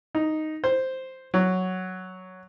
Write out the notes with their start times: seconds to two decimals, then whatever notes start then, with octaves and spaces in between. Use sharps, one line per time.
0.15 D#4
0.64 C5
1.34 F#3